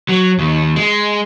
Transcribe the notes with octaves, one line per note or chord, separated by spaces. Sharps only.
F#3
D#2
G#3